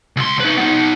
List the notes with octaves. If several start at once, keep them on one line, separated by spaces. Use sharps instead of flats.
C#2 C6
D#4 B4
B3 D#4